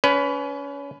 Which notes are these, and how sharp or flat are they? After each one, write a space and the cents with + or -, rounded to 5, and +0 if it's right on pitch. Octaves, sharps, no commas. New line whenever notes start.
C#4 +30 B4 +15